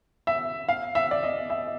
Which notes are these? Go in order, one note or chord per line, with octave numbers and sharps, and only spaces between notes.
E5
F5
E5
D5
D#5
E5